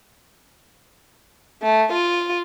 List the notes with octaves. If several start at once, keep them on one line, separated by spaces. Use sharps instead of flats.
A3
F4